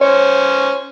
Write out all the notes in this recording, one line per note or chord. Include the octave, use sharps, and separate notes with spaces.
C#4 C5 C#5